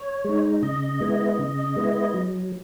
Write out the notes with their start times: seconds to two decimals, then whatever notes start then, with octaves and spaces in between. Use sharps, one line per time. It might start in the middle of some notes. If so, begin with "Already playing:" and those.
Already playing: C#5
0.24 G#3 D#4
0.62 C#3 D#5
1.00 G#3 B3 E4
1.39 C#3
1.76 G#3 B3 E4
2.14 F#3